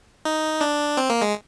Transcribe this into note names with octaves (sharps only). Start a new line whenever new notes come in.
D#4
D4
C4
A#3
G#3